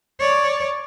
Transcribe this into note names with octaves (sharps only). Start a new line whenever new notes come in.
C#5 D5